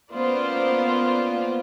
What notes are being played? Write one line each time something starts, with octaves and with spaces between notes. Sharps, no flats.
A#3 B3 C#4 F4 C5 D5